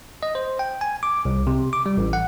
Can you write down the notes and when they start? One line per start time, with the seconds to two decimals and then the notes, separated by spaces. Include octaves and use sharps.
0.23 D#5
0.35 C5
0.59 G5
0.81 G#5
1.03 D6
1.25 C2
1.47 C3
1.73 D6
1.86 G3
1.97 A1
2.13 F#5